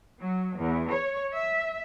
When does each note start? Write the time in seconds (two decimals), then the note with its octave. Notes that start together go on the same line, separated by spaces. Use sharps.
0.20 F#3
0.57 E2
0.89 C#5
1.33 E5